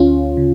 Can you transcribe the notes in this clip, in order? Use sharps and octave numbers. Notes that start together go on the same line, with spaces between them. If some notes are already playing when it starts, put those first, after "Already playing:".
Already playing: D2 C#4 F4
C#3